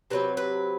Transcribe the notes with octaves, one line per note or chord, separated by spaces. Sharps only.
C3 F#3 C4 B4
B4